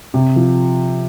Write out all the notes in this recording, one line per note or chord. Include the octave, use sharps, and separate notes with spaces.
C3
F3